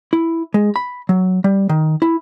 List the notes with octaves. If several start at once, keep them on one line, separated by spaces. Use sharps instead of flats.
E4
G#3
B5
F#3
G3
D#3
E4